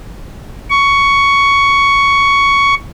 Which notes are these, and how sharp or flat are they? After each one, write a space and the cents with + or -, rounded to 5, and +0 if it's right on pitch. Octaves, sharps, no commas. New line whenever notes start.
C#6 +10